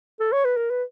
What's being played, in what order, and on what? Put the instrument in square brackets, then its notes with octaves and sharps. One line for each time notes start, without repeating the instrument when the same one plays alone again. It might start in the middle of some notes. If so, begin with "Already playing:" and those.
[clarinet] A4
C#5
B4
A#4
B4